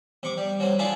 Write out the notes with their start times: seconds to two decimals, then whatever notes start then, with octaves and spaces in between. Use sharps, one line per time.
0.23 C3 C#6 D6
0.37 G3
0.60 F#3 G3 C4
0.79 D4 E4 F4 G#4 A4 D5